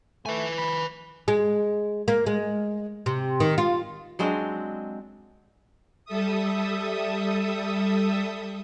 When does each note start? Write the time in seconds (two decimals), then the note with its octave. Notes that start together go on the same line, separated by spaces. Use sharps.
0.26 A3 B4 G#5
0.58 B5
1.28 G#3
2.08 A#3
2.26 G#3
3.06 C3
3.40 D#3
3.58 F4
4.19 F#3 G#3 C4 D4
6.05 G3 A4 E5 D#6